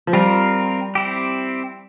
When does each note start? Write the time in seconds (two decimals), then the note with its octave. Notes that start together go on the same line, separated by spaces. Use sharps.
0.07 F3
0.13 G3 C4 F4 A#4
0.95 C4 E4 G4